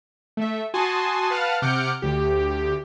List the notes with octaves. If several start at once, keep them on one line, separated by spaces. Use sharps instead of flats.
A3 E5
F#4 G#5 A5 C6 D#6
B4 F5 F#5 A5 F6
C3 F#5 D6 F6 G6 C#7
D2 G4